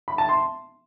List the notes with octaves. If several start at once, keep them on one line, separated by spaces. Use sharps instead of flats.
B5
A5
C6